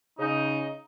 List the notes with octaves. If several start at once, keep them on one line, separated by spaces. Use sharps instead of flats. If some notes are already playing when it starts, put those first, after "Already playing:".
C#3 D#4